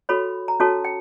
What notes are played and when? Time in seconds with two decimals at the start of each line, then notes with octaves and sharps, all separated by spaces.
0.09 F#4 A4 C#5 B5
0.48 A#5
0.60 C#4 F#4 A4 C#5 A5
0.85 G5